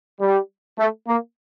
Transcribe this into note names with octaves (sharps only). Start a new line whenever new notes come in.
G3
A3
A#3